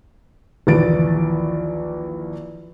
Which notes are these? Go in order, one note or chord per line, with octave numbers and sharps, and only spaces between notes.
A#1 D#2 E3 A6 D7